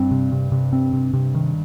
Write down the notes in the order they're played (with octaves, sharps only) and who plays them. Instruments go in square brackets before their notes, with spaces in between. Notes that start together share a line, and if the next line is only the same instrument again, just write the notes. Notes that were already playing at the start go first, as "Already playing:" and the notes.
Already playing: [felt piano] G2 [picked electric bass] C4
[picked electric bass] C3
C3
C3
C4
C3
C3
D#3